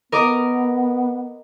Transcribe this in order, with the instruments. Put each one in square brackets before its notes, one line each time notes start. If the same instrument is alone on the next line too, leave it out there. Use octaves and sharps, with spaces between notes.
[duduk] B3 [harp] A#4 D#5 D6